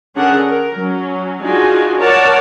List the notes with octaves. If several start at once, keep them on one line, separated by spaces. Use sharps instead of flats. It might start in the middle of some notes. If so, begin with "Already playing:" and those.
D3 C#4 D4 G#4 A#4 F#5
A#4
F#3 C#4
D4 D#4 F4 F#4 G#4 G#5
A#4 C#5 D5 F#5 A5